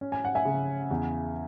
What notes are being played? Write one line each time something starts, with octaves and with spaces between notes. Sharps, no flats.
C#4
G#5
F#5
E5 G#5
C#3
E2